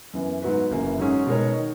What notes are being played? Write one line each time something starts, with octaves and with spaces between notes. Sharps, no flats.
F#2 E3 B3
G#2 F#3 B3 F#4 B4
F#1 F#2 E3 A#3
G#2 F#3 C#4 G#4
B2 G#3 D#4 A#4 C#5
D#3